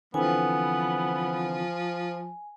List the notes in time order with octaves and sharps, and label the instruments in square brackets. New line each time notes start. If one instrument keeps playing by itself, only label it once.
[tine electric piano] D3 E3 C4 [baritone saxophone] F3 [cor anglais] B3 [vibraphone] G#5